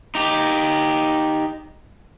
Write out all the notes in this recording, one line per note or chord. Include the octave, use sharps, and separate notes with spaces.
D#4 G4